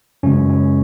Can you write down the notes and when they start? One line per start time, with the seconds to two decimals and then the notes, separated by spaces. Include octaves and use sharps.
0.23 F#2 C#3 G#3 C#4
0.50 C#4